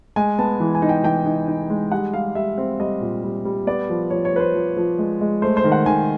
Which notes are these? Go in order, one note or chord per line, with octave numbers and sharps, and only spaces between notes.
G#3 G#5
B3 A5
E3
G#5
D#4
G5
E3 G5
D#4
D#4
G#3
G3 F#5
G3 F5
G3 E5
C4
G3 D#5
A#2
G3
G3
B3 D5
F3
F3 C#5
C#5
F3 B4
C5
F3
F3
G#3
G#3
A3 C5
C5
D#3
F#5
D#3 G#5